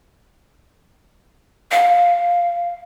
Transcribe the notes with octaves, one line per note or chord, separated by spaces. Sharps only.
F5